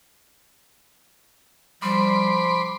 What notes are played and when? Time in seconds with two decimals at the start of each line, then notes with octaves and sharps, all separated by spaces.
1.82 F3 G3 B5 C6 D6